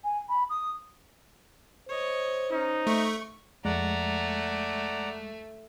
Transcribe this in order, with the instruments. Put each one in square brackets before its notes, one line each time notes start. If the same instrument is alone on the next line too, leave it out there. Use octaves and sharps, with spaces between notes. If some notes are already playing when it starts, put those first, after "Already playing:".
[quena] G#5
B5
D#6
[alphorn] C5 [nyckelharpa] C#5 D#5
[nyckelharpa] C#4 [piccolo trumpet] D#4
[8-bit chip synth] A3 [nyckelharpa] C#6
[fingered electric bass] F2 [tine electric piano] G#3 [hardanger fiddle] A3 [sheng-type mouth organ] D5 F#5 A#5